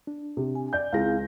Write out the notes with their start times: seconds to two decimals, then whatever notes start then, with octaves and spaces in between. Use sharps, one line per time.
0.07 D4
0.37 C3
0.55 G#5
0.73 D5 G6
0.93 C#2 C4 E4 G#4 F5 A#6